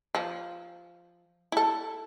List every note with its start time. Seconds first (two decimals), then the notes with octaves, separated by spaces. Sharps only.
0.15 F3
1.52 E4 A4